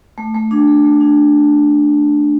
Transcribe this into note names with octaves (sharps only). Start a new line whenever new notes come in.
A3
A3
D4
A3
A3
D4